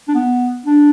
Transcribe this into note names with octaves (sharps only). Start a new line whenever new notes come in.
D4
B3
D4